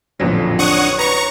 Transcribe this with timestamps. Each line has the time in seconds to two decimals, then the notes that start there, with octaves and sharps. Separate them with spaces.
0.20 A1 F2 A#2 D3 F#3
0.59 D4 C#5 F#5 C#6 D#6
0.99 B4 A#5 C#6